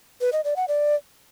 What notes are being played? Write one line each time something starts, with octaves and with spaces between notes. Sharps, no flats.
B4
D#5
D5
F#5
D5